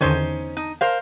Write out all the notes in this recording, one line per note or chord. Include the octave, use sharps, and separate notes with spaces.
E2 D3 D#3 C#4 D#4 C5
D#4
A#4 C5 F5